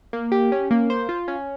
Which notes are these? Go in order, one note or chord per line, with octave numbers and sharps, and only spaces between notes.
A#3
G4
C#4
A#3
C5
F4
C#4